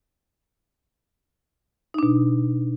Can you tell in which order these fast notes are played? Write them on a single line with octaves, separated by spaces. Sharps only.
D#4 D4 B2